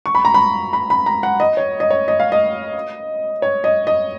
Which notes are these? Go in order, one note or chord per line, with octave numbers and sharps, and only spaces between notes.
C#6
B5
A#5
B5
B5
B5
A#5
F#5
D#5
C#5
D#5
C#5
D#5
F5
D#5
C#5
D#5
D#5